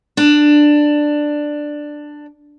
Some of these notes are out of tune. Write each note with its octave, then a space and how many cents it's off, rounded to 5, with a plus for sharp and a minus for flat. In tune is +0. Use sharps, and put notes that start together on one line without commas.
D4 +10